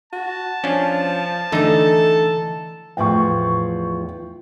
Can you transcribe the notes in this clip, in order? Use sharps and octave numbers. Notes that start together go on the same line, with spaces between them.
F#4 A5
F3 C#4 D4
D3 E3 A3 D#4 A4 A#5
E2 A2 F3 G5 C#6